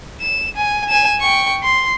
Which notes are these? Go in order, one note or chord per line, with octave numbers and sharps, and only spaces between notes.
E7
G#5
G#5 E7
G5 C#6
C6